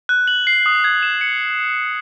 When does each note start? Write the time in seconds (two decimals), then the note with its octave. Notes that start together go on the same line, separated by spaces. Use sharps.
0.09 F#6
0.27 F#7
0.47 C7
0.66 D#6
0.84 G#6
1.03 E7
1.21 C#7